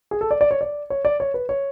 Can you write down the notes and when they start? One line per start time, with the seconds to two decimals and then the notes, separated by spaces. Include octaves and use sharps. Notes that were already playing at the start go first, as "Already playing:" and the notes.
0.11 G#4
0.21 A4
0.31 D5
0.41 D5
0.51 C#5
0.61 D5
0.90 C#5
1.05 D5
1.20 C#5
1.34 B4
1.49 C#5